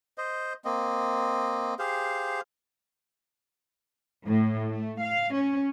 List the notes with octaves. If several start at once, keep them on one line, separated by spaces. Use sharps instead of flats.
C5 D#5
A#3 C4 D#5
G4 G#4 C5 F5
A2
A3
F5
C#4